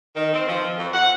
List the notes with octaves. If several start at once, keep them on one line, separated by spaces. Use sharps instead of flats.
D#3
C4
F3
F2
F#5